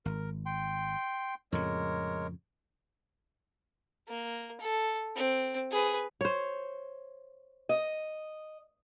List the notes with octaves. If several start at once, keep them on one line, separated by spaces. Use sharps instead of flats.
G#1 A#4
G5 C6
F2 A2 C#3 G#3 A#4 C#5
A#3
A4
C4
G#4 B4
C5 C#5
D#5